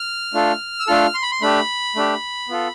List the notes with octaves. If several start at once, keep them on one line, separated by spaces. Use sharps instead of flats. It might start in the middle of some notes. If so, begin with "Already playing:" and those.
Already playing: F6
A3 D4 F4 A4
E6
A3 D4 F4 A4 F6
C6
B5
C6
A3 D4 G4 B5
A3 D4 G4
B3 F4 A4